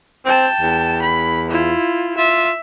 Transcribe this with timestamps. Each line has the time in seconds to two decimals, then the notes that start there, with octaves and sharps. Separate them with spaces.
0.25 C4 G5 A5
0.61 E2
1.02 B5
1.50 E4 F4
2.18 F4 E5